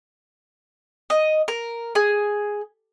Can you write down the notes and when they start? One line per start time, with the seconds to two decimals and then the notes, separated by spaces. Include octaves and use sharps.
1.10 D#5
1.48 A#4
1.95 G#4